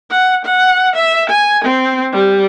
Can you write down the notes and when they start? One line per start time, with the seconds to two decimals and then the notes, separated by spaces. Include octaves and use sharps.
0.11 F#5
0.45 F#5
0.96 E5
1.30 G#5
1.65 C4
2.13 G3